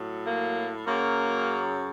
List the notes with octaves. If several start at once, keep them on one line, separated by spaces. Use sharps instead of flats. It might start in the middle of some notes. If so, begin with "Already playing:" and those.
Already playing: A2 F#3
A#3
F#2 C#3 F#3 A#3